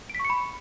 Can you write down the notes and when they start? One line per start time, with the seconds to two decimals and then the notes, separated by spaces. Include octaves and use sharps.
0.10 D7
0.15 B6
0.20 C#6
0.25 C#7
0.30 B5